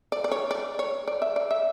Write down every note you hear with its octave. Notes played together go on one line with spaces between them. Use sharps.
D5
D5
C#5
D5
C#5
D5
E5
D5
E5